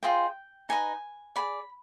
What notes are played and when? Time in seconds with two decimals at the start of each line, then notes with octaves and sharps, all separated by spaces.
0.03 F4 G#4 C5 D#5 G5
0.69 D#4 B4 D#5 G#5
1.36 G#4 D5 B5